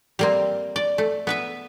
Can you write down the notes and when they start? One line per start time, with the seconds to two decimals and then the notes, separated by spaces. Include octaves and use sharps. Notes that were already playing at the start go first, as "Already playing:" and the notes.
0.19 G3 A#3 C4
0.76 D5
0.98 A3
1.27 B3 B4 E5